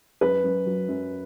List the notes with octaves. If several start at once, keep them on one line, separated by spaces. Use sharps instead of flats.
F#2 B4
F#2
F#3
F#2